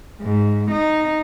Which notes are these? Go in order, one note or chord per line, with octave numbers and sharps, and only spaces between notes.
G#2
D#4